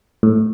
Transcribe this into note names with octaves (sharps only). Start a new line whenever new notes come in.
A2